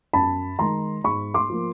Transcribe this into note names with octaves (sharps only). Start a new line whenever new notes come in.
F#2 A5 B5
D#3 G#3 A#5 C6
G#2 B5 C#6
C6 D6
F3 A#3